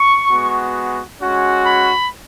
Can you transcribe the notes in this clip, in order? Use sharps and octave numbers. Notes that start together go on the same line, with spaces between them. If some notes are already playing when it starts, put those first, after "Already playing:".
Already playing: C#6
G#3 B3 F#4
G#3 C#4 F#4
B5